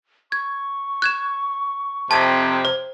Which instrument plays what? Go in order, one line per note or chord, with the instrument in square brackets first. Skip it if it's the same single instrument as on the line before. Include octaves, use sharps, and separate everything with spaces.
[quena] C#6 [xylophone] G#6
[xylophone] F#6 G#6 E7
[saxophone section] F2 C3 [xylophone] A5
[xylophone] C5